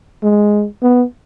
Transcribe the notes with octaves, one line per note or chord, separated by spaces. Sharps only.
G#3
B3